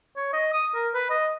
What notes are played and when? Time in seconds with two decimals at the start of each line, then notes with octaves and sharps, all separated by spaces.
0.17 C#5
0.33 D#5
0.53 D#6
0.74 A#4
0.94 B4
1.10 D#5